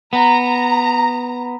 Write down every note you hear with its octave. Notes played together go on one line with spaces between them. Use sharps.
B3 A#5